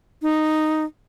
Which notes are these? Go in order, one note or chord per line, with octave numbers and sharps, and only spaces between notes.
D#4